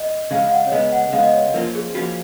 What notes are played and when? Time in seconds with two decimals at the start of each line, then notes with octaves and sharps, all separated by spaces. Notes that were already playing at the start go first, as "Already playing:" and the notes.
Already playing: D#5
0.31 C#3 G#3 C#4 F5
0.47 F5
0.51 F#5
0.67 C#5
0.72 C#3 G#3 B3 D#5
0.92 F#5
1.12 C#3 G#3 B3 F5
1.23 D#5
1.34 C#5
1.54 F3 A#3 C#4 F4 A#4
1.75 G#4
1.95 F3 A#3 C#4 F4 F#4